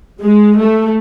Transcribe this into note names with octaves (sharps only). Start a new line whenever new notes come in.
G#3
A3